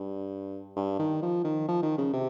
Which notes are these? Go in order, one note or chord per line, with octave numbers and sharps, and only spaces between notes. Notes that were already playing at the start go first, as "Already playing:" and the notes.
Already playing: G2
G2
D#3
F3
D#3
F3
D#3
C#3
C3